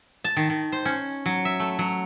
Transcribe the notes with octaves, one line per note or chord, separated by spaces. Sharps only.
A5
D#3
D#3
C5
C#4
F#3
E5
A3
F#3